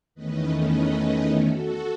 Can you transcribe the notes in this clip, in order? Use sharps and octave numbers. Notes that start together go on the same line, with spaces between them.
E2 D#3 A3 C#4 B4 D#5
B4 D#5
F#4 A4